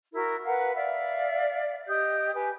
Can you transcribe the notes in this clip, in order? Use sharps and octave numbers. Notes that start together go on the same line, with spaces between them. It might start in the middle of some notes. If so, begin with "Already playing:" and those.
E4 F#4 A#4
A#4 B4 F5 F#5
D5 E5 F5
G4 D#5 D#6 G6
G4 B4 G#5